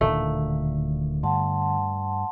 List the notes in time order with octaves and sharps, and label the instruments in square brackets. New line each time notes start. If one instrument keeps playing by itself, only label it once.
[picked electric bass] D1 A#2 D#3 [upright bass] D3 [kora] A3
[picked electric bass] G2 [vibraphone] F#5 A5 C6